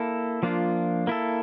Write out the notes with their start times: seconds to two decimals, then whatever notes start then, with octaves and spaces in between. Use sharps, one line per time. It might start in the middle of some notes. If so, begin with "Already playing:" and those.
Already playing: A#3 E4 A4
0.43 F3 A#3 D4 F4
1.07 A#3 E4 A4